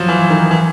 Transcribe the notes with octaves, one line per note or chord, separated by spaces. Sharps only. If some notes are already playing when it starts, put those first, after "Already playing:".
Already playing: F3 F#3
E3
D#3
E3